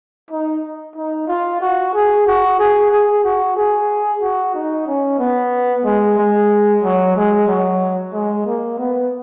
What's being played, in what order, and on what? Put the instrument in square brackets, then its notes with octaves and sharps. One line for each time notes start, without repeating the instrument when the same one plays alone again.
[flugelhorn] D#4
D#4
F4
F#4
G#4
F#4
G#4
G#4
F#4
G#4
F#4
D#4
C#4
B3
G#3
G#3
F#3
G#3
F#3
G#3
A#3
B3